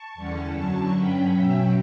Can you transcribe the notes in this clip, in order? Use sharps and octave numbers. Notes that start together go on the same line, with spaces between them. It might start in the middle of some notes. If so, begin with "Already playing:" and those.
Already playing: A5 C#6
E2 D3 G3 C#4
F#2 D3 F#3 A5 C#6
G2 F#3 C#4 G5 B5
B2 F#3 C#4 E5 G5